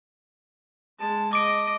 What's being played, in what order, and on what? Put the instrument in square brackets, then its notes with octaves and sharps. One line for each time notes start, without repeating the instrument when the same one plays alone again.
[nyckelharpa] G#3 A5
[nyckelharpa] D#5 [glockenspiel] D6 D7